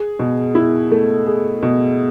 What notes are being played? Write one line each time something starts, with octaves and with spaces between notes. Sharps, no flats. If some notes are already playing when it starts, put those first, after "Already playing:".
Already playing: G#4
B2
E4
A3
G#4
B2